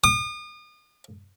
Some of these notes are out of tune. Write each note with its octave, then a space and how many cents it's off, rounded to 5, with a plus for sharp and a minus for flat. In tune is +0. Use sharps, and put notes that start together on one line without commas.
D#6 -40